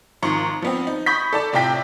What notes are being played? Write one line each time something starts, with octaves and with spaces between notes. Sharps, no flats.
G#1 D#3 F3 C6 C#6 C#7
F3 B3 C4
D#4
B5 C#6 D#6 G6 B6
A4 D5 A5
A2 C3 F4 D5 G5 B6